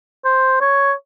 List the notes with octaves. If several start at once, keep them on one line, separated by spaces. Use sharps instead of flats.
C5
C#5